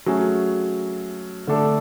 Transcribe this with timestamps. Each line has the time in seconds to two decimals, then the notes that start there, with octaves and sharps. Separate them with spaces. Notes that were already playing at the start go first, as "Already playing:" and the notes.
0.06 F#3 A3 C#4 G#4
1.47 D3 A3 D4 A4